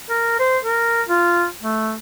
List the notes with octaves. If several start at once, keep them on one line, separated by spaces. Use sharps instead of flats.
A#4
C5
A#4
F4
A3